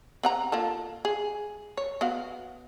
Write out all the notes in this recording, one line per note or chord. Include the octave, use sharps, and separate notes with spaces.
C4 F#5 A#5
A#3 F4 A4
G#4
C#5
B3 F#4 F5